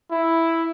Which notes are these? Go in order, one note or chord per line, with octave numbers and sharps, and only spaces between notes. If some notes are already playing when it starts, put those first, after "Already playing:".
E4